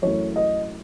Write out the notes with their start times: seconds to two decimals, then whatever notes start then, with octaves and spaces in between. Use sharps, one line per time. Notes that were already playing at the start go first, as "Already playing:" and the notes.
0.02 F#2 E3 A3 C#5
0.36 D#5